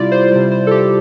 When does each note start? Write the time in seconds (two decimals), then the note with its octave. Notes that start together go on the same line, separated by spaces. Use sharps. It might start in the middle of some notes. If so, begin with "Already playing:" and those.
Already playing: C3 G3 E4 F4 D5
0.12 C5
0.32 C3 G3 C5
0.52 C5
0.67 A4
0.71 G4